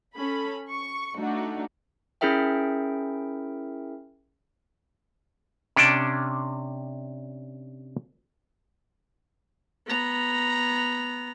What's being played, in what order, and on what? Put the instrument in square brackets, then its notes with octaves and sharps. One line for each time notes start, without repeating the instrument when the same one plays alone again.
[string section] C#4 A4 B5
C#6
A3 D4 D#4 F#4
[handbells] C#4 E4 G#4 A#4 E5 G5
[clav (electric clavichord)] C3 C#4 D4 G5 A5
[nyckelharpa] B3 A#5